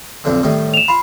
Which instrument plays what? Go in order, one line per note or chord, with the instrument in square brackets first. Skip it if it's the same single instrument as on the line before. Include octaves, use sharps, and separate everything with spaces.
[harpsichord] B1 F2 D3
A2 D#3 G3
[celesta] E7 F7
[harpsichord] F4 [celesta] B5